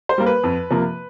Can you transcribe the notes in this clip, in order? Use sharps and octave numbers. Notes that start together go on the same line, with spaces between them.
C5
G3 A#3
B4
F2
C3 F3 A#3